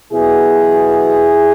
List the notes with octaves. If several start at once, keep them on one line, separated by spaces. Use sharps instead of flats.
B2 F#3 B3 E4 G#4